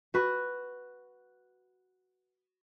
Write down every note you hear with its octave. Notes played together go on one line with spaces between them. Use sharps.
F#4 B4